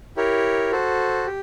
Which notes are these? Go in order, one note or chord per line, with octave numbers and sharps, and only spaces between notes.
E4 G4 A#4 C#5
F#4 A4 C5
G4